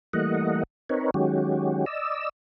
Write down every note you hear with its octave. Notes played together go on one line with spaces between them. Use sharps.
E3 G3 A3 A#3 D#5 F#5
C4 D#4 A#4 B4 C#5
D#3 F#3 G#3 C#4 F#4 G4
D5 D#5 E6